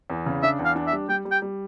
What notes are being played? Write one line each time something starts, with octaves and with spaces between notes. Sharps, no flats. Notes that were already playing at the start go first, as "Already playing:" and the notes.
E2
C#3
D4 E5
E2
F5
D4
E5
G3
G3 G5
G3
G5
G3